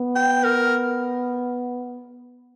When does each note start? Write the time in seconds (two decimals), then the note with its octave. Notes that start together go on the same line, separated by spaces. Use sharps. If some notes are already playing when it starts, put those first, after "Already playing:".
Already playing: B3
0.16 G5
0.44 A#4